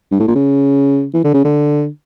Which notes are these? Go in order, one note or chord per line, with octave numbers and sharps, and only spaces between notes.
G2
A2
A#2
C#3
E3
D3
C#3
D3